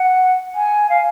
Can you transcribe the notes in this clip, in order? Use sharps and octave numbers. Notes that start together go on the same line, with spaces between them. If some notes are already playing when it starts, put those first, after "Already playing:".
Already playing: F#5
G#5
F5